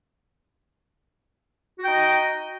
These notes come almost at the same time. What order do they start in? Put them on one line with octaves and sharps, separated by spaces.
F#4 G5 D#4 D#5